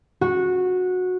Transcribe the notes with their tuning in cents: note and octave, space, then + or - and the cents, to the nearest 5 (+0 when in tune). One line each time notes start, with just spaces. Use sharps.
F#4 -15